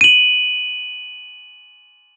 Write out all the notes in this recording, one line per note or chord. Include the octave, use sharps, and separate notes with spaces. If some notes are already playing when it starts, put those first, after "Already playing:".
D#7 F#7